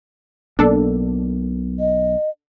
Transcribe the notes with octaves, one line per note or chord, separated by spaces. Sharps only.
B1 B2 A#3 D4 A4
D#5